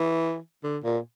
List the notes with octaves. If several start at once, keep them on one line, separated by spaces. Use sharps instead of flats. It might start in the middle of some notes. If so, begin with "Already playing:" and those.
Already playing: E3
D3
A#2